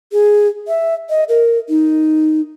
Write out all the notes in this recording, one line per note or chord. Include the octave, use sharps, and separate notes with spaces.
G#4
E5
D#5
A#4
D#4